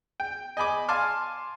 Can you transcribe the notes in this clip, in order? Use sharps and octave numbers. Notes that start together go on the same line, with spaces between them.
G5
D#5 G#5 B5 D6
F5 G#5 A5 C6 D6 F6